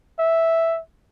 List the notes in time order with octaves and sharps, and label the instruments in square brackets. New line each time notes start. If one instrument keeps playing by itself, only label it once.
[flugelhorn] E5